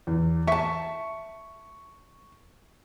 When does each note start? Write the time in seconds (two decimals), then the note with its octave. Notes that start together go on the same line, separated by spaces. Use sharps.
0.07 E2
0.47 E5 A5 C#6